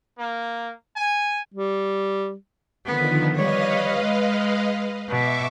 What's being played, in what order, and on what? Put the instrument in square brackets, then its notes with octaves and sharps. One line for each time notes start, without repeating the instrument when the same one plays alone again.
[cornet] A#3
G#5
[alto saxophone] G3
[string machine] D3 D#3 F3 [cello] B3
[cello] G3 C#5 [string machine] B4 D#5 F5
[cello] G#3
[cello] B2 [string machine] E5 C#6 D6